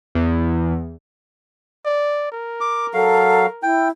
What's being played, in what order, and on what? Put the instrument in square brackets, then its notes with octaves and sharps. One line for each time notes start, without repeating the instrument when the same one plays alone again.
[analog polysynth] E2
[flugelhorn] D5
A#4
[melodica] D6
[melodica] F#3 F5 [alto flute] A4
[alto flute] E4 [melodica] G5